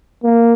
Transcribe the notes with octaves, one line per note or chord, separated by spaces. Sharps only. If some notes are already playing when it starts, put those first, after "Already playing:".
A#3